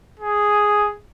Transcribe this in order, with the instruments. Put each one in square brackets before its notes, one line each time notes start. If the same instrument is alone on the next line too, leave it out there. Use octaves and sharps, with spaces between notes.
[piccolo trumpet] G#4